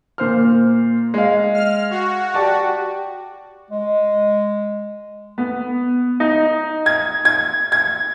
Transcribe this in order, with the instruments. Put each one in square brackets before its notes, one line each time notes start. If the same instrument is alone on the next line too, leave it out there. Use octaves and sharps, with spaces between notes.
[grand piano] A#2 C5 F6
G#3 F5
[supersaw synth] F6
F#4
[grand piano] G4 D5 A5
[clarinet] G#3
[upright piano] B3
D#4
G#6
G#6
G#6